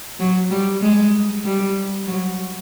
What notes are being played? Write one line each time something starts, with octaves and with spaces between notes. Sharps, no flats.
F#3
G3
G#3
G3
F#3